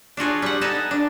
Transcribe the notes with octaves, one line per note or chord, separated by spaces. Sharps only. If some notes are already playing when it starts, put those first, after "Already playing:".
D4 F4 F#4 G#4
G3 F#5
B3 D#4 A4 G#5 A5
D4